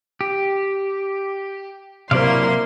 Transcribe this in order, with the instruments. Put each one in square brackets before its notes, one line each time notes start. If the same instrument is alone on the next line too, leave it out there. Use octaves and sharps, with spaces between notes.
[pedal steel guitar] G4
[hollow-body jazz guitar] C3 F#3 C5 [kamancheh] A#3 C6 [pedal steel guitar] E4 D5 F5